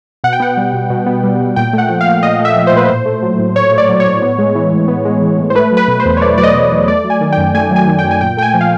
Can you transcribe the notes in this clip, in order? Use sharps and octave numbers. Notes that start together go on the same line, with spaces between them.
B2 F#5
G5
B3 F#5
G3
B2
B2
B3
G3
B2
A#2 G5
A3
F#5
F3
F5
A#2
A#2 D#5
A3
E5
F3
C5
A#2 B4
A2 C5
A3
F#3
A2
A2 C#5
A3
D5
F#3
C#5
A2
B3
G#3
E3
A2
B3
G#3
E3
A2
C5
A3 B4
F#3
B4
B2
C5
E2
C#5
A3 D5
F#3 D5
D#5
B2
E2
A3 D5
F#3
G#5
D#3
G5
F#2
A3 G#5
F#3
G#5
D#3
G5
F#2
G#5
A#2 G5
A3 G5
G#5
F3
F5